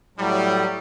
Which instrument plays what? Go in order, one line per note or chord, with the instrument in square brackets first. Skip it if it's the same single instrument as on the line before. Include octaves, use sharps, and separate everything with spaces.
[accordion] A2 F#3 [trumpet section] G3